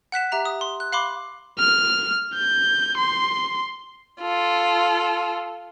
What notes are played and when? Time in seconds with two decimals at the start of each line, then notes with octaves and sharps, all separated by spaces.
0.12 F#5 F#6 B6 E7
0.32 G4 E5 A#5 F7
0.45 D#6
0.61 C6
0.80 F#6
0.92 F5 B5 C6 D6
1.59 F6
2.34 G6
2.98 C6
4.21 F4 A4